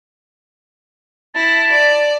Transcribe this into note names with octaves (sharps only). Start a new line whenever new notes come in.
E4 A5
D5